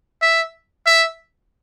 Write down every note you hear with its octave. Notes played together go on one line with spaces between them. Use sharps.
E5
E5